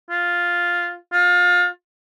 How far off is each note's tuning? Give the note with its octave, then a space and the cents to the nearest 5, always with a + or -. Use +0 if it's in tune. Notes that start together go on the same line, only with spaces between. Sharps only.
F4 +0
F4 +25